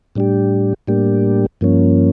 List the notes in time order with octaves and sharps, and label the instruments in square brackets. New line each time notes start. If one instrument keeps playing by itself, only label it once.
[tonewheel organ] A2 G3 D4 G4
A2 G3 A#3 D4 G4
G2 F3 A#3 C#4